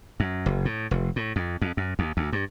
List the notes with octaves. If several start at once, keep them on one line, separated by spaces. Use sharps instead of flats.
F#2
F#1
A2
F1
A2
F2
F2
F#2
D#2
D2
G2